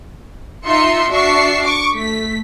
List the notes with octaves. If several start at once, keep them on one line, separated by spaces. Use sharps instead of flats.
D#4 F4 E5 C6 C#7
D4 F#4 E5 C#6 C7
C#6 D6
A3 B6